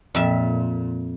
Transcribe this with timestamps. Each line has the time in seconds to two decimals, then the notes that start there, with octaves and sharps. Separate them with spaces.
0.15 F2 A#2 E5